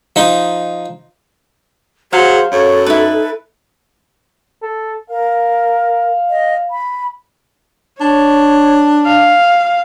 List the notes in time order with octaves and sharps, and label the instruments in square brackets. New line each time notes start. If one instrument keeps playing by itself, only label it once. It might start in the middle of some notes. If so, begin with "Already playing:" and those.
[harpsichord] F3 D#4
[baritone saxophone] F#3 [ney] G#4 [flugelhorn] C5 [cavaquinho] F5
[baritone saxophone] F#2 [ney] A4 [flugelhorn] C#5
[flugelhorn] D#4 [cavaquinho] E4 B4
[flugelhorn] A4
[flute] A#4 [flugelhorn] F5
[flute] D#5
B5
[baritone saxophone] D4 [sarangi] C#5
[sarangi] F5